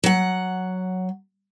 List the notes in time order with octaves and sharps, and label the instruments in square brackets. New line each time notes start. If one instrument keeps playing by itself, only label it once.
[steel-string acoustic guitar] F#3 F#5